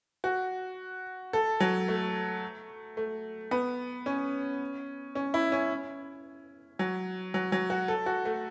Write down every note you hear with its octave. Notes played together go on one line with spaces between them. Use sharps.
F#4
A4
F#3
A3
A3
B3
C#4
C#4
E4
C#4
F#3
F#3
F#3
F#4
A4
F#4
A3